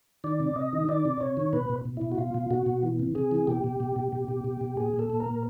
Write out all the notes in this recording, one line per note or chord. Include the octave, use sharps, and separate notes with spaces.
D#3 D5
C3
C3 D#5
D#3
D#3 D5
C3
C3 C#5
D#3
B2 B4
B2
B2
B2 E4
F#4
B2 F4
B2
B2 F#4
B2
E3
C3
C3 G#4
E3
B2 G4
B2
B2
B2
B2
B2
B2
B2
A#2 G#4
A#2
A4
A#2
A#4
A#2